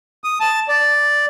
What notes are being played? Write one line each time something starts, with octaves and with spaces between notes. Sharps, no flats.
D#6
A5
D5